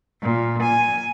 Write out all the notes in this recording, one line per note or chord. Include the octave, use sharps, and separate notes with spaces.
A#2
G#5